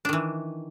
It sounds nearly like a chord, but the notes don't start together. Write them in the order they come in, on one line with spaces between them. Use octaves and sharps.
D4 D#3 E3